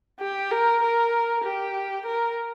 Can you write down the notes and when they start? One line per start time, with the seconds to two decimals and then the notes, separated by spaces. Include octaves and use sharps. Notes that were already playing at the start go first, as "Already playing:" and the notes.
0.20 G4
0.51 A#4
0.82 A#4
1.44 G4
2.06 A#4